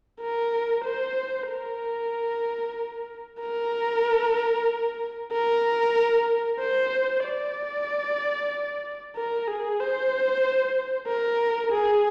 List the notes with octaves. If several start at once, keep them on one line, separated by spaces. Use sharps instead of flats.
A#4
C5
A#4
A#4
A#4
C5
D5
A#4
G#4
C5
A#4
G#4